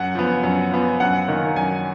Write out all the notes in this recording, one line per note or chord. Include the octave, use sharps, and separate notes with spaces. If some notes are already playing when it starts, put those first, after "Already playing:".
Already playing: F#2 F#5
F3 B3
F#2
F3 B3
F#2 F#5
D#3 A#3
F#2 G#5